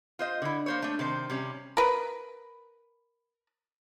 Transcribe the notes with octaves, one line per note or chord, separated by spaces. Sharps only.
F4 C5 D#5
D3 E4
A#3 C5 C#5
A3 D4
C3 D#3 C5
C3 G3 C#4
A#4 B4